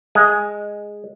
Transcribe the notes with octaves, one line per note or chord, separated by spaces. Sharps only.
G#3